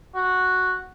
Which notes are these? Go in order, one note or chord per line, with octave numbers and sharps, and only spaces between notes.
F#4